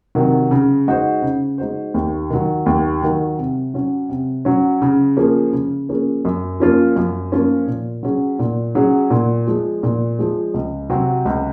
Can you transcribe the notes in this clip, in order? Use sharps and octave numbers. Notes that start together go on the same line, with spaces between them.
C3 D#3 F#3
C#3
G#3 D#4 F#4 C5
C#3
G#3 D#4 F#4 C5
D#2
D#3 F#3
D#2
D#3 F#3
C3
F#3 C#4
C3
F#3 C#4
C#3
F3 A#3 C#4 G#4
C#3
F3 A#3 C#4 G#4
F#2
F3 A#3 C#4 F4
F#2
F3 A#3 C#4 F4
A#2
F#3 C#4 G#4
A#2
F#3 C#4 G#4
A#2
F3 G#3
A#2
F3 G#3
C#2
C3 F#3 C4 F#4
C#2